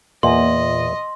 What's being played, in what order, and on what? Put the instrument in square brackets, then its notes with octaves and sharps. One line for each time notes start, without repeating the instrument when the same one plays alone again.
[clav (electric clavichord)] E2 [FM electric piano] A#2 [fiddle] D#5 [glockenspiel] C6